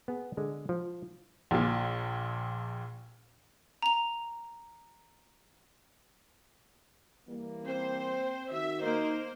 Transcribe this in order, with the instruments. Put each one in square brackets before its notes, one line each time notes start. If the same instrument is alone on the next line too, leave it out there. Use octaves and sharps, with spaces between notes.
[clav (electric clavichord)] B3 G#4
D3 G#3
F3
[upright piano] A#1 A#2
[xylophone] A#5 F7
[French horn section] E3 G3 A#3
[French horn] C4 [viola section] C5
[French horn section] D#3 F#4 [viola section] E5
[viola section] A#3 A#4 C5 [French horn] D#4